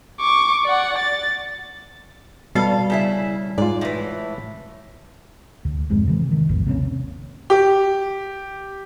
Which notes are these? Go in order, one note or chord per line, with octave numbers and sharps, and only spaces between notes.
C#6 D6
D5 F#5
A6
B2 G3 A4 F5
C#3 E4 E5
G#2 F4 D5
A2 E3
D2
D1 F2 G#2 G#3
C3 E3
D#3
A#1 E2 G#2
C3 A#3 C4 C#4
G4